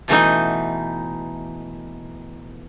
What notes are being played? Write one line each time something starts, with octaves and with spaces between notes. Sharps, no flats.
B2 E3 A3 D#4